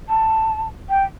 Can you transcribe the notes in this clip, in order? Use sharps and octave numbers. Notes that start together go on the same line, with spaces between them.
A5
G5